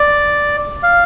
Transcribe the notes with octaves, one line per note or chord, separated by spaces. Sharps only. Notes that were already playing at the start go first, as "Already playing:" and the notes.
Already playing: D5
F5